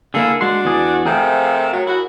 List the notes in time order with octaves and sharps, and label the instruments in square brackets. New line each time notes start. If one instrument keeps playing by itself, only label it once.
[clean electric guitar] D3 A#3 E4 [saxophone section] G#4 A4 F5
[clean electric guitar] G#3 C6 [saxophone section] D4 F#4
[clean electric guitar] E2 G#4 D5
[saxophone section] C3 F3 A3 [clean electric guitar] G#4 A#4 G5
[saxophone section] F#3
E4 F#4